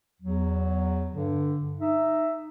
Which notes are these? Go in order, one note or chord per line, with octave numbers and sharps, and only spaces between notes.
E2 F#3
G2 D3
D#4 E5